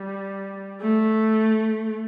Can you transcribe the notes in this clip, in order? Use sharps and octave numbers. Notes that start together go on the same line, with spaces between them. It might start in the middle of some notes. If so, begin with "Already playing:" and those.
Already playing: G3
A3